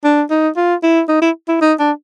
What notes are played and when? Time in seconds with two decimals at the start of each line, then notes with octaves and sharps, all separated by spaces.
0.04 D4
0.30 D#4
0.57 F4
0.83 E4
1.09 D#4
1.22 E4
1.49 E4
1.62 D#4
1.80 D4